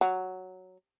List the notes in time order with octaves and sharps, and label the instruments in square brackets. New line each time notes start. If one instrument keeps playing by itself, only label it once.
[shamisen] F#3